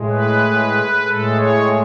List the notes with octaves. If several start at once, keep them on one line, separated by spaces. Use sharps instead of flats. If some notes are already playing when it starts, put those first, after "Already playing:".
Already playing: A2 G#3
B4
A2 G#3 A4
C#5